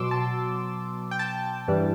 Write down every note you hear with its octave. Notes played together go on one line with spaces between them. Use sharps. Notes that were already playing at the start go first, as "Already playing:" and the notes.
Already playing: B2 F#3 C6 D6 E6
A5
G5
A5
G2 E3 G3